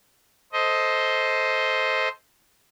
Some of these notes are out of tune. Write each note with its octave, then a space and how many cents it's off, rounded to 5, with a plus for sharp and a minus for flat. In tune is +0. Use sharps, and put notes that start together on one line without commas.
A4 +0 C5 +0 D#5 +15